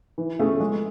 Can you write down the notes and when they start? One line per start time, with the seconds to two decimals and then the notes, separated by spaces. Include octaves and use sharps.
0.18 E3
0.39 A3 C#4 G#4
0.60 G#3